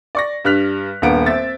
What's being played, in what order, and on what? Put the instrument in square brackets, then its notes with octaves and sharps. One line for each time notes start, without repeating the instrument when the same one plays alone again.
[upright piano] D5 C#6 A#6
G2 G3 F6 F#6 B6 F7
D#1 G2 A#3 B3 D7
C4 E5 A6